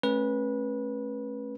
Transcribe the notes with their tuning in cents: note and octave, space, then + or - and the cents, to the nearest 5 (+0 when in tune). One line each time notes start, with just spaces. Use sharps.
A3 -25 C#4 -30 B4 -25